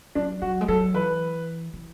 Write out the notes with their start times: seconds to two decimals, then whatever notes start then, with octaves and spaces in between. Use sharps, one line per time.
0.15 F#3 D4
0.42 F#3 F#4
0.61 G#3
0.68 F#3 A4
0.94 E3 B4
1.73 E3